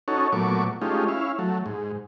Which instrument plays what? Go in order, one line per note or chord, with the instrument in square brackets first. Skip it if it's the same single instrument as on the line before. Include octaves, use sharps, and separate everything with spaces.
[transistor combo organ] C#4 D#4 F#4 A4 C#5
A#2 F#3 A3 B3 C#6 D6
G#3 A3 C#4 D#4 F4 G4
C#4 E4 F5
F#3 A3
G#2